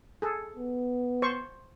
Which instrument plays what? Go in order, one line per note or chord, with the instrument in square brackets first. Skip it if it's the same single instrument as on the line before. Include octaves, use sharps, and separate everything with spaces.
[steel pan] G#4 A4
[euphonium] B3
[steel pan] C5 C#6